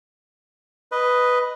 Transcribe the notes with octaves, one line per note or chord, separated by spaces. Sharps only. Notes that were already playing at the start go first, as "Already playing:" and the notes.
B4 D#5